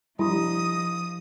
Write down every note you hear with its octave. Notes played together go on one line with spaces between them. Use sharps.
F3 G3 E4 G4 D#5 D#6